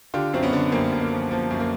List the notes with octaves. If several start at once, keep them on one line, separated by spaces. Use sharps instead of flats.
D3 F4 G4
F#2 C4
B3 C#4
D3
F#2 A#3 C4
F#2
A#3
F3
F3 A#3
F#2
A#3